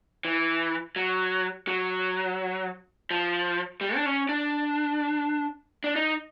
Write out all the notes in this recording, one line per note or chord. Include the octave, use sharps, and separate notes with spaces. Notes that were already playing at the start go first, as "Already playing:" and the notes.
E3
F#3
F#3
F3
G3
D4
C#4
D4
D4
D#4